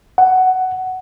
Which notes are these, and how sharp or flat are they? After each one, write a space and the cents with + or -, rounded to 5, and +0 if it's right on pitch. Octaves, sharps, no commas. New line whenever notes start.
F#5 +10